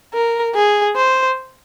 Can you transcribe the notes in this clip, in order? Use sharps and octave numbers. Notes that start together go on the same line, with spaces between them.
A#4
G#4
C5